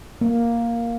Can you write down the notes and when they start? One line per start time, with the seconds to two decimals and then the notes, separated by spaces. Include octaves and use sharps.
0.21 A#3